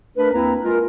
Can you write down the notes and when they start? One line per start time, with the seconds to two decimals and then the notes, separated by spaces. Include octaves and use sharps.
0.17 A3 D4 A#4 B4
0.33 D#2 A#3 C4 E4 B4 A#5
0.63 G#3 F4 A#4